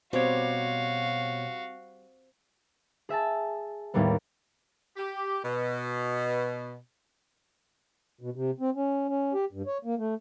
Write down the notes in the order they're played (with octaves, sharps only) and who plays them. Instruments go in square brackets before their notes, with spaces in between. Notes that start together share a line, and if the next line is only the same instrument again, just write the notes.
[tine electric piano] B2 C#5 [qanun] G3 C4 G4 [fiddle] F#4 F5
[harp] G#4 E5 G#5 A5
D#2 A2 G3 A#3 B3
[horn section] G4
B2
[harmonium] B2
C3
C4
C#4
C#4
G4
G2
C#5
A#3
A3